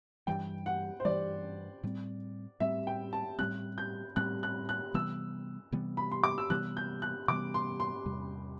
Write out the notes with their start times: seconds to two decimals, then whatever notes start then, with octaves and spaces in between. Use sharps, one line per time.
0.27 G2 E3 G3 G5
0.66 F#5
1.00 C5
1.05 G2 E3 G3 D5
1.83 A2 G3 C4
2.60 A2 G3 C4 E5
2.87 G5
3.13 A5
3.38 A2 G3 C4 F#6
3.78 G6
4.16 A2 G3 C4 F#6
4.43 F#6
4.69 F#6
4.94 C3 E3 G3 B3 E6
5.72 C3 E3 G3 B3
5.97 B5
6.12 C6
6.24 D6
6.38 E6
6.50 C3 E3 G3 B3 F#6
6.77 G6
7.02 F#6
7.28 C3 E3 G3 B3 D6
7.54 C6
7.80 C6
8.06 E2 C3 G3